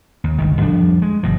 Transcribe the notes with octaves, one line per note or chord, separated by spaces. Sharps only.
D#2
G1 C#2 D#3
F2 F3 G3 D4
G#3
G1 B2 F3